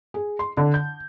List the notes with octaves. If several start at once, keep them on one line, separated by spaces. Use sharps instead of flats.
G#4
C6
D3
G6